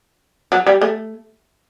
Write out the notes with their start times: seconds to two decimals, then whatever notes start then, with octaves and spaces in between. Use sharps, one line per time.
0.52 F#3
0.67 G3
0.81 A3